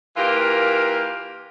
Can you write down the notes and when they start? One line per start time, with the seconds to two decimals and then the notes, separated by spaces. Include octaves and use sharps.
0.17 E3 A#3 F4 G4 A#4